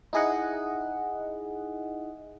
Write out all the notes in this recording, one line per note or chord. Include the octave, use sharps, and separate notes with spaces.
D#4 E4 G#4 D#5 F#5